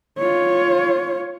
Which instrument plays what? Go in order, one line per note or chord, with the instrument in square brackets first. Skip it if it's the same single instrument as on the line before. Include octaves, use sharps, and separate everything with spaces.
[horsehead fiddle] F4 C#5